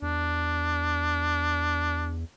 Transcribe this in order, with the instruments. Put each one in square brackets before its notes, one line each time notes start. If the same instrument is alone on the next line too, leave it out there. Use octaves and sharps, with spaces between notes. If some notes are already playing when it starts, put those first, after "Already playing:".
[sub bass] E2 [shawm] D4